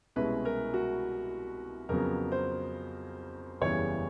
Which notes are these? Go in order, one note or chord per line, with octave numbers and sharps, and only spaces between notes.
C2 B2 G#3 C#4 E4 B4
A#4
F#4
F2 C#3 F#3 B3 A#4
C5
F#1 E2 C#3 E3 G3 C#5